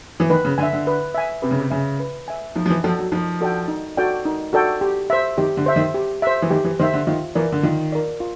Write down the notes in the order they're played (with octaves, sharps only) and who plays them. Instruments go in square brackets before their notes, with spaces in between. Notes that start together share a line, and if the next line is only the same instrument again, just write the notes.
[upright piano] E3
[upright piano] D#3 [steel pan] B4
[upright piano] C#3
[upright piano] D3 [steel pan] G#5
[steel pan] E5
[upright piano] D3
[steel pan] B4
E5 G#5
[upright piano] C3 [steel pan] B4
[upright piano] C#3
C3
[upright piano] C#3 [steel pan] E5 G#5
[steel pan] B4
E5 G#5
[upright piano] F3 [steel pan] D#4
[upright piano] F3
E3
[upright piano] F3 [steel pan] F#4 A4 D5 G5
[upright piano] F#3
[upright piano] F3 [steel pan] D#4
[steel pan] F#4 A4 D5 G5
D#4
F#4 A4 D5 G5
D#4
F#4 A4 D5 G5
G4
C5 E5
[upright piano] D#3 [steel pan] G4
[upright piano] D3
[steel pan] C5 E5
[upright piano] D#3
[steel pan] G4
C5 E5
[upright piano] E3
[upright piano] D#3 [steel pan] G4
[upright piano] E3
[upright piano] D#3 [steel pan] C5 E5
[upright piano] D3
[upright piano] D#3 [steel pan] F4
[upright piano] E3 [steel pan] A#4 D5
[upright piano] D3
[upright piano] D#3 [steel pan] F4
[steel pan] A#4 D5
F4